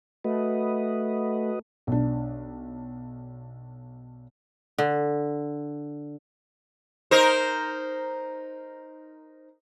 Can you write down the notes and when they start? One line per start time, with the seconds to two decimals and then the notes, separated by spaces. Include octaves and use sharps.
0.24 A3 F#4 B4 D#5
1.87 B1 D4
4.78 D3
7.11 D#4 A#4 C5